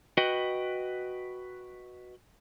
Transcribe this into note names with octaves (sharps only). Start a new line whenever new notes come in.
F#4 B4 D#5 G5